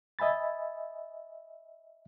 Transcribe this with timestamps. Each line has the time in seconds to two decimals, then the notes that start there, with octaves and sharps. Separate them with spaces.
0.19 D#5 E5 G#5 B5 A6